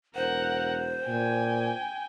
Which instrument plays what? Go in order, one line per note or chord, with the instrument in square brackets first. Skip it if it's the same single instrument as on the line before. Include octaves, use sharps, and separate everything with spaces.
[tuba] E1 [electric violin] A#4 F#5 [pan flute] C5
[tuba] A#2 [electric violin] G5 G#5